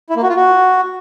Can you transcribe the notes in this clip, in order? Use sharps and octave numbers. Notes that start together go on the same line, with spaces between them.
E4
A#3
F#4
F4
F#4